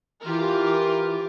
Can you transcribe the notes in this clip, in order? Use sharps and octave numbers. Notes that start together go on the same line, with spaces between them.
E3 F4 G4 A#4